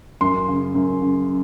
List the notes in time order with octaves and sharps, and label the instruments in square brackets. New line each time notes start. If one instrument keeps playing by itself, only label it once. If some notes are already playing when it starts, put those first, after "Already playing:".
[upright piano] F#2 C6
C#3
F#2
C#3